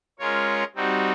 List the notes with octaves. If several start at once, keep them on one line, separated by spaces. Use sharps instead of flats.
G#3 C#4 F4 A#4 C#5
G3 C4 D#4 F#4